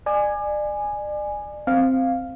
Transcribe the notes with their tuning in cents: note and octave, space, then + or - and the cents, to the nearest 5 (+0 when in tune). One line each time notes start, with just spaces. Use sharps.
D5 +35 G#5 +0
C4 +0 F5 +0